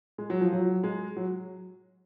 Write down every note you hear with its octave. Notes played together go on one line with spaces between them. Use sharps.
G#3
F#3
F3
F#3
G#3
F#3